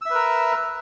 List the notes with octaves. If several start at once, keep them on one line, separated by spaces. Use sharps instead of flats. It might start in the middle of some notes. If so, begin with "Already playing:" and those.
A#4 B4 E5 E6